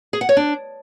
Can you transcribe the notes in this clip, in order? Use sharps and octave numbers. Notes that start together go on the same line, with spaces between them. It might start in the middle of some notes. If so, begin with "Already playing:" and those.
G#4
F#5
C#5
D4